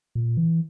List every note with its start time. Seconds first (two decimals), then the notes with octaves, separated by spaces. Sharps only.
0.15 A#2
0.37 E3